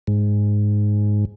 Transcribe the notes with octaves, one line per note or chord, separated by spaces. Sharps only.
G#2